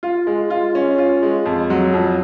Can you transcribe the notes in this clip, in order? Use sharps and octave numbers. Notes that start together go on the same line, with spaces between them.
F4
G#3
F4
C#4
F4
G#3
F2
F#3
F2